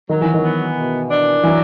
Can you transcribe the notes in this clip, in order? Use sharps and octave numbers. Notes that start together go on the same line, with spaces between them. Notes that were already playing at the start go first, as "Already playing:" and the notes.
D#3 F#3
E3
D#3
B3
B2
D4
E3 F#3